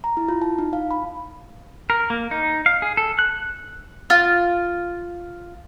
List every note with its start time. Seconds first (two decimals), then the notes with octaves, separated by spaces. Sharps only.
0.04 A#5
0.17 E4
0.28 F4
0.42 A5
0.58 D#4
0.73 F5
0.91 B5
1.90 A#4
2.10 A#3
2.31 D#4
2.66 F5
2.82 G#4
2.97 A4
3.19 F#6
4.10 F4